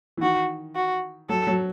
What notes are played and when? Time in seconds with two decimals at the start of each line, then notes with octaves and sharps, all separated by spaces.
0.17 E3
0.22 D#3 F#4
0.75 F#4
1.29 F#3 A4
1.47 F#3